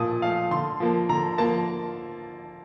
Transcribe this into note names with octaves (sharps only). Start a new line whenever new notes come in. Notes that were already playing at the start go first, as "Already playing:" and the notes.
Already playing: A#2 F3 A3 A5 D#6
F3 A3 F5
D3 C6
F3 A#3
D3 A#5
F3 A#3 A5